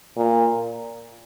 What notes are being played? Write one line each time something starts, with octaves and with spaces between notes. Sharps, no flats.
A#2